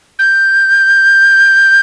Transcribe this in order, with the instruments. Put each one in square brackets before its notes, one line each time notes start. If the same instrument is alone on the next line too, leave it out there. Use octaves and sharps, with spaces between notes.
[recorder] G6